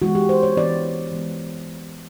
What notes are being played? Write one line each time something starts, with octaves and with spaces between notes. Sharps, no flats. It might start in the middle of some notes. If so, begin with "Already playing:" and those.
E3 G#3 B3 F#4
G4
C5
C#5
E3 G#3 B3 D5
E3 G#3 B3